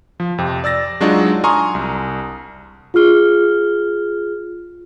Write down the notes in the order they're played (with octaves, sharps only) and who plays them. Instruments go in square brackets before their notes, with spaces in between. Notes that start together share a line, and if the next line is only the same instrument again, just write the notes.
[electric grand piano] F3
F2 C3
D5 E6 A6 A#6
F#3 G#3 D4 D#4 F4 F#4
G#5 A#5 C6 C#6 D#6 F6
C2
[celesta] F4 G#4 F6 G7